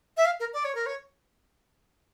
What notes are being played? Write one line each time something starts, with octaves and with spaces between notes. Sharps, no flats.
E5
F5
A#4
D5
C#5
A#4
C#5